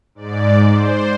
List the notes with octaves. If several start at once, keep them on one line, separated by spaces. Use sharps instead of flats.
G#2 D5
C5